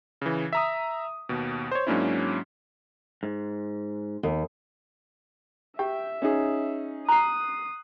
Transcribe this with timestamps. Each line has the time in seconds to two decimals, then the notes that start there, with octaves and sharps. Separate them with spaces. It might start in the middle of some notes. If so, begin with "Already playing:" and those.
0.22 C#3 E3
0.53 E5 A#5 D#6
1.29 D#2 B2
1.72 C5 C#5
1.87 G#2 F#3 A#3 C#4 D4 E4
3.23 G#2
4.23 D#2
5.79 G4 E5 G5
6.22 C#4 D#4 G#4
7.09 A#5 D#6 F#6 C7